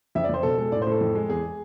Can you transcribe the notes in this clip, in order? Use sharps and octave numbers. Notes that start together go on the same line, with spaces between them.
F2 E5
D5
F2 C5
B2 A4
G#3 A4
A2 D5
C5
A2 A4
F2
G#3
E2 G#4